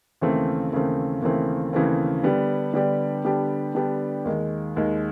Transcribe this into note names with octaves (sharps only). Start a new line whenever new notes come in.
D#2 C#3 E3 A3 C4
D#2 C#3 E3 A3 C4
D#2 C#3 E3 A3 C4
D#2 C#3 E3 A3 C4
D3 G3 B3 D4 G4
D3 G3 B3 D4 G4
D3 G3 B3 D4 G4
D3 G3 B3 D4 G4
D#2 D#3 G#3
D#2 D#3 G#3